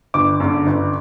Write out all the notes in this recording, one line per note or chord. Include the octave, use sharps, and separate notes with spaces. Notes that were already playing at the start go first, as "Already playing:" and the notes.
G1 D6
F#2 D3
G1